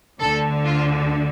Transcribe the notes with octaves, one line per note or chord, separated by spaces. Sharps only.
D2 D3 A4
F4